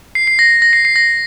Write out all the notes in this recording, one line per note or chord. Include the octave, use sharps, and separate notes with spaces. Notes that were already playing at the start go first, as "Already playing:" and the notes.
C7
C7
A#6
A#6
C7
C7
A#6